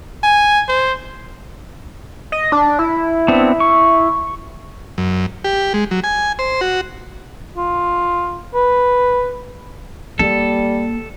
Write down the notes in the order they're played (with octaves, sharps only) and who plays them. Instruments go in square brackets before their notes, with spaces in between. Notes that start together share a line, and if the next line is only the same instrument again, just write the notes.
[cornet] G#5
C5
[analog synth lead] D#5
D4
E4
[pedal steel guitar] B3 C4 D4
C#6
[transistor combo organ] F#2
G4
G#3
F#3
G#5
C5
F#4
[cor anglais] F4
B4
[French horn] G3 [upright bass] A#3 [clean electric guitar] A4